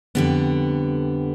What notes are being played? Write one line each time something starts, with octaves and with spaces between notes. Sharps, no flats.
F2 D3 G3 B3